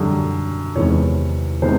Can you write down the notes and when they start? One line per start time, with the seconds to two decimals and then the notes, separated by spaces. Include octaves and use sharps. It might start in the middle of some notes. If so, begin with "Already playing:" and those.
Already playing: F#2 D3 G3
0.75 E2 C3 D#3 G#3 B3 C#5
1.62 C3 D#3 G#3 B3 C5